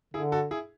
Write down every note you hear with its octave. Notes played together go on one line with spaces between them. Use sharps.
D3 E4 G#4
F#4 A4
E4 G#4